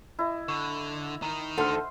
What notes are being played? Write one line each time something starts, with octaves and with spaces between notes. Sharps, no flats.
E4 D#5
D3 C#6
D#3 D#4 A#5
D2 D3 A4 C5 F#5 F6